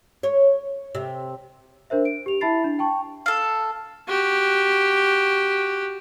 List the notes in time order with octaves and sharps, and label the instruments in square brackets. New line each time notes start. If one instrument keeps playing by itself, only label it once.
[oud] C#5
C3
[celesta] D4 A#4 C5 E5
D7
G4 F7
E4 E5 A5 B5 A6 C7
D4
G5 A5 C#6
[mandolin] A4 F5
[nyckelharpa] F#4 G4